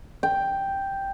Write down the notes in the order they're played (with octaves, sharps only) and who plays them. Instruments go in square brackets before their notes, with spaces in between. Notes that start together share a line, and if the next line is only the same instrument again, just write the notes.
[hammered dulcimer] G5